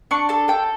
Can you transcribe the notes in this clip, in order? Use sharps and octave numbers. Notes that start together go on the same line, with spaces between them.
D4 C#6
A4 A5
A4 G5